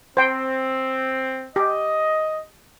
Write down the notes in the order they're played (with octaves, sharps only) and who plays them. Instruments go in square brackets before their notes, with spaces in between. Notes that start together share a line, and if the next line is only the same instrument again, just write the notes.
[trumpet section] C4 [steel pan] C5 G5
[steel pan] G4 [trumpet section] D#5